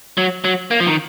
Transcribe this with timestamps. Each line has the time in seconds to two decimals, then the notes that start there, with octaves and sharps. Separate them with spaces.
0.18 F#3
0.44 F#3
0.71 A#3
0.80 F3
0.87 D#3